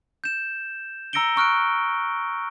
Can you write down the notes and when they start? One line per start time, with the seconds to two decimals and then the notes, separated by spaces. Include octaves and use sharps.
0.24 G6 E7
1.13 A#5 E6 A#6 C#7 D7 G7
1.36 A#5 C#6 F6 F#6 D7